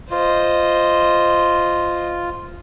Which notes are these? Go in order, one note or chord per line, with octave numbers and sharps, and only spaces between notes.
F4 C5 D#5